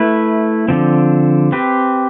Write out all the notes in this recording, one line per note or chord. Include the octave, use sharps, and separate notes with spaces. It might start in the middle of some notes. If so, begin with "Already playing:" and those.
Already playing: A3 E4 B4
D3 F3 C4
C4 G4 B4